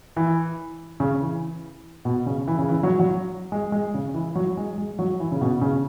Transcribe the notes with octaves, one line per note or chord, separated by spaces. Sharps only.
E3
C#3
E3
B2
C#3
E3
C#3
E3
F#3
F#3
G#3
G#3
C#3
E3
F#3
G#3
G#3
F#3
E3
C#3
B2
C#3